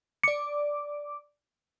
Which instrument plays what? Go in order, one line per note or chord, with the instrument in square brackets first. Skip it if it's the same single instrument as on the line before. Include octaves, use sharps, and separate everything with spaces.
[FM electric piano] D5 D6 [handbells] C#7